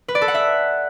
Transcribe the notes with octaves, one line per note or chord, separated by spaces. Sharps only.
B4
D5
A4
F#5
E5